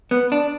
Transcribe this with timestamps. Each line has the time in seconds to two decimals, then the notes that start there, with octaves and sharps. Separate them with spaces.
0.11 B3
0.32 D4